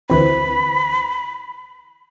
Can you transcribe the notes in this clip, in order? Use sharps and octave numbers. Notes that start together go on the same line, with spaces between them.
D2 E3 C4 B5